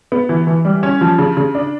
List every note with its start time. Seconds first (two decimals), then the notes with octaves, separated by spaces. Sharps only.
0.12 B3
0.29 E3
0.47 E3
0.65 G3
0.83 C#4
1.01 F3
1.18 C#3
1.37 C#3
1.55 D4